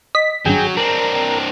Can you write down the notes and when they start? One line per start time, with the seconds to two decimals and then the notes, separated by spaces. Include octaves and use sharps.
0.15 D#5 B6
0.46 G#1 G2 F#3 G#4 G5
0.77 C4 D4 A#4